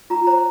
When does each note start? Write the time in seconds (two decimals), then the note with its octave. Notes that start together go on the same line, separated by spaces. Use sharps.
0.10 F4 A#5
0.27 C5 A#5